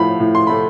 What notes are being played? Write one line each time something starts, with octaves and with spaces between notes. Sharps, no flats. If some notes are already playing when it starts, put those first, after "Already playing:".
Already playing: A2 F3 A3 F5 B5
A2
C6
A3 B5